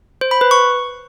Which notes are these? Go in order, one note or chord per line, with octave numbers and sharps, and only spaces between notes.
C5
B5
B4
C#6